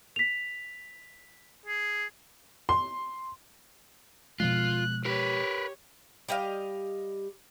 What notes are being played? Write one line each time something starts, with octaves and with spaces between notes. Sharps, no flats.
B6 F7
G#4
C6
B2 F3 G#3 F4 F#6
G4 A#4 B4 C#5
G3 G4 D#5 F5